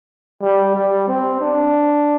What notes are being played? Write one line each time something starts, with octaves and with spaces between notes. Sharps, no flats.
G3
G3
C4
D4